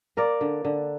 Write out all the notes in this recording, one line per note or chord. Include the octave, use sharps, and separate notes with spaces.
A#3 A#4 D5
D3
D3